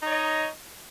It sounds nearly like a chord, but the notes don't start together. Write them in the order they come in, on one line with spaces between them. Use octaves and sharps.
D#4 C#5 D#5